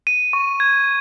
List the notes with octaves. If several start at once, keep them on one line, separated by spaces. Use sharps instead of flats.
D#7
C#6
G#6